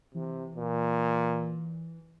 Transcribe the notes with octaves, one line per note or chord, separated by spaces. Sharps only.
C3 E3
A#2